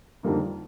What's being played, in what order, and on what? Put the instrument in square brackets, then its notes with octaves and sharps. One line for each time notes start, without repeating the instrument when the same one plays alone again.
[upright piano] F2 D3 G3 A#3 D#4